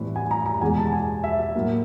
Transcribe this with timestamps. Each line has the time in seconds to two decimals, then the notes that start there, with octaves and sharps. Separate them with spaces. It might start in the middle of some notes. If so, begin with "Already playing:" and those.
Already playing: A2 E3 G3 C4
0.16 G#5
0.31 A#5
0.46 A#5
0.61 E2 B2 G#3 G#5
0.78 A5
0.93 G#5
1.24 E5
1.39 E5
1.55 A2 F#3 A#3